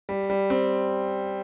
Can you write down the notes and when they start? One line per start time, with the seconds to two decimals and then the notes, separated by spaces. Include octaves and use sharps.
0.09 G3
0.30 G3
0.50 C4